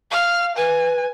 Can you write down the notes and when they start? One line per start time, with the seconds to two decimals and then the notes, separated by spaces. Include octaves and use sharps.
0.12 F5 F6
0.57 B4 G#5